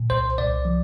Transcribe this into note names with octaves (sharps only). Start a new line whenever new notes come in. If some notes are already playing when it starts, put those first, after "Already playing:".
Already playing: A#2
C2 C5
C2 D5
F3